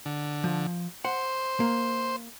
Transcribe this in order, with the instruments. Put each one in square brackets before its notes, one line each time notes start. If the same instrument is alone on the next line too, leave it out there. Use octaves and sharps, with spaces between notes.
[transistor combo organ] D3
[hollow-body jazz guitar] F3
[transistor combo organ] C5 [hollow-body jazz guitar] F#5
[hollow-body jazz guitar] A#3